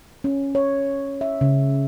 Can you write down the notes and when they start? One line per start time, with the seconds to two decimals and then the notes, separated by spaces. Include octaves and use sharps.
0.24 C#4
0.55 C#5
1.21 E5
1.41 C#3